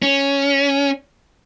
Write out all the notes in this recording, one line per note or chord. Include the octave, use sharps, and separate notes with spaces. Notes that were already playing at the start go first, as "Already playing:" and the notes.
C#4